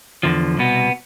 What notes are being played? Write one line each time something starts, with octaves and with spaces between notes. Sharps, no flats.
E2 D3 F3
C2 B2 B3